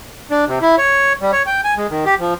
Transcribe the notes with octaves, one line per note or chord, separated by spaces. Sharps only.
D4
C3
E4
C#5
G3
C#5
G5
G#5
G#3
D#3
G4
F3